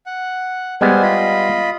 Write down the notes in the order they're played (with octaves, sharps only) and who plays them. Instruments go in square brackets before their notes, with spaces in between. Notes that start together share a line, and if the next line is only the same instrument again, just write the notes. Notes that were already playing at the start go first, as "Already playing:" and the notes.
[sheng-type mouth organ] F#5
[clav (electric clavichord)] G3 G#3 B3 [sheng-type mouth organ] C5 G#5
[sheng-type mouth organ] F4 D#5 B5